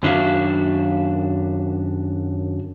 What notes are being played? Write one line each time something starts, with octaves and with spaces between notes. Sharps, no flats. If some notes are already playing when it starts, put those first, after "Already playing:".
F#2 D#3 D4 F#4 E5 F5